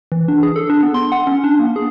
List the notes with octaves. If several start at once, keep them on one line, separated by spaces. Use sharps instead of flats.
E3
D4
G#4
A4
D4
B3
C6
F#5
C#4
D4
A#3
G#4